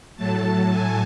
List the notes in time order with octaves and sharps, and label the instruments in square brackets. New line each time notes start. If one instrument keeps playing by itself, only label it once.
[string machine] A2 F#3 A3 A5
G#5